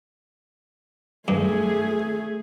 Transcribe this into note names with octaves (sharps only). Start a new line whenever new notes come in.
G2 A3 G#4